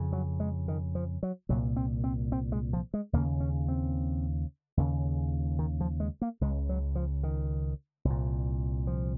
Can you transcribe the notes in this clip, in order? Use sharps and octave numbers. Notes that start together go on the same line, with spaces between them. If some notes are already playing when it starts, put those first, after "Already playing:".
Already playing: F2 C#3
F#3
G#3
D#3
F3
F#3
C2 A#2 F#3
C4
C4
C4
G#3
F3
G#3
D#2 C#3 A#3
C#4
C4
D#2 C#3
D#3
F3
G#3
A#3
C#2 C#3 G#3
F#3
F3
D#3
C2
A#2
F3